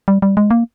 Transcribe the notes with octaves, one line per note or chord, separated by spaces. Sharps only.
G3
G3
G#3
A#3